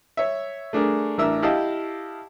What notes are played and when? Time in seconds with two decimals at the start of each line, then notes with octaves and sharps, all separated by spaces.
0.17 C#5 E5
0.73 A3 D4 G#4 A#4
1.18 A1 D4 A#4 E5 E6
1.43 E4 G4 D#5 F5 G5 A5